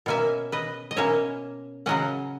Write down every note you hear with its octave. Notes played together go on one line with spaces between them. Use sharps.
B2 A#3 C#4 E5 G#5
B4 D#5
D#5
B2 A#3 C#4 C#5 E5
C#3 F#3 C#4 D#5 F#5